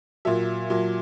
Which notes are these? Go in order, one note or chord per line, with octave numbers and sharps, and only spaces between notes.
A#2 F#3 E5
A#2 F#3